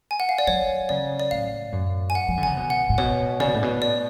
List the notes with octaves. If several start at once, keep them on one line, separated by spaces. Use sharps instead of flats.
G#5
F#5
F5
D5
F#3 C#5
C#3 D5
D5
A2 F5
F#2
G#5
F#5
F3
D3
C#3 G#5
B2
F#5
A2
B2 C#5
C#3 D5
B2
A2
B2
D5